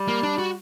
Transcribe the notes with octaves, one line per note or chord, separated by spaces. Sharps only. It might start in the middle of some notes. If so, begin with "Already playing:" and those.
Already playing: G3
A#3
D4
F#4